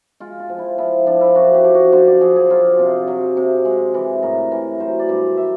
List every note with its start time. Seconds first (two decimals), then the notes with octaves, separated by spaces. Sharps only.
0.20 G#3 F4
0.40 F4
0.49 F3
0.58 E4
0.78 F3 E4
1.06 F3 D4
1.21 E4
1.36 F#2 F#4
1.54 G4
1.64 F3
1.74 F#4
1.92 D3 C5
2.07 D5
2.21 F3 G#4
2.36 G#4
2.50 F#3 F4
2.79 C3
3.08 F#3
3.37 C3
3.65 G#3
3.94 E3
4.22 A2 A#4
4.52 E3
4.80 F#3 C5
4.99 D5
5.09 G2
5.37 E5